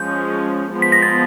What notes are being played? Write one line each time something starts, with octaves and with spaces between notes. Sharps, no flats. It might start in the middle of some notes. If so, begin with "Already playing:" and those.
Already playing: F3 G#3 C#4 G6
F3 G#3 B3
B6
A#6
A6